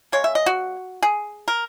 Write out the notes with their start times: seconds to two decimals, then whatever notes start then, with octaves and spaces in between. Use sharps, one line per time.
0.12 C#3 G#3 C#5
0.24 E5
0.35 D#5
0.46 F#4
1.02 G#4
1.48 A#4